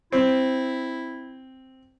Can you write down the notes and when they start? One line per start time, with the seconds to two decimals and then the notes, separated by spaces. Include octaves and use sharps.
0.12 C4 E4